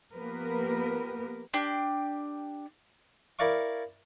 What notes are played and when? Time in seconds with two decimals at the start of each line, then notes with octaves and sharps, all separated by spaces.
0.14 F3 A#3 B3 G4 A#4 B4
1.54 D4 G4
3.39 E4 A#4 D5 F5 C#6